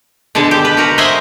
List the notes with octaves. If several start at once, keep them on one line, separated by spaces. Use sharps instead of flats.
B2 D3 G#3 A5
G4
B4
F#4 A#4
C5 D#5 E5 F#5 G#5